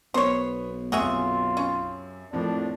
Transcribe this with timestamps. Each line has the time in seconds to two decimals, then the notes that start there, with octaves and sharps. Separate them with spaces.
0.14 B1 B3 C5 C#5
0.92 F#2 C3 F4 F#4 G#4 E5
1.57 C#4
2.33 F2 A2 F3 A#3 D4